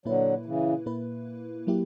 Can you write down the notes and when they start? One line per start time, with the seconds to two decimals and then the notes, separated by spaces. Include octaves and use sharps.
0.05 A#2 D3 F#3 A#3 E4 B4
0.45 C#3 E3
0.86 A#2 A#3 E4 B4
1.67 F#3 A#3 E4 G4